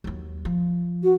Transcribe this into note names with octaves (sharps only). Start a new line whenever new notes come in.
D#2 F#3
F3
F#4